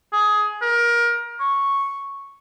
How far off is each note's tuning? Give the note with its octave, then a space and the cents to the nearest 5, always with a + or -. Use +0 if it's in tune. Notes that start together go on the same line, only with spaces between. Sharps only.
G#4 +15
A#4 +25
C#6 -5